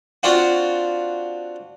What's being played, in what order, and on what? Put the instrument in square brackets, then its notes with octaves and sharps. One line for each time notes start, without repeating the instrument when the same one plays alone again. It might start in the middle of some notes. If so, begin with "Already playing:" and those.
[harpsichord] C4 D4 F4 F#4